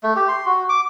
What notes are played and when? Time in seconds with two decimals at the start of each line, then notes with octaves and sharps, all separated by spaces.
0.03 A3
0.16 G4
0.28 C6
0.46 F#4
0.69 D6